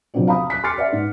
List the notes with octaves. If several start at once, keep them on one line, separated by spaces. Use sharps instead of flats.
C3 F3 F#3 B3 C4 D4
F5 A#5 B5 D#6
F#6 B6
C6 D6 F6 A6 C7 C#7
B4 D5 E5 F#5
G#2